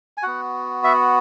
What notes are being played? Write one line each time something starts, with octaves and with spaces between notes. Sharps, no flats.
G#5
B3 F#4 F#5
E5